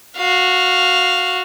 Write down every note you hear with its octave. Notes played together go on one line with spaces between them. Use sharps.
F#4 F5